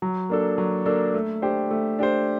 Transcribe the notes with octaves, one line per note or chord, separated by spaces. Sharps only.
F#3
A#3 D4 A4
F#3
A#3 D4 A4
A3
D4 G4 C5
A3
D4 G4 C5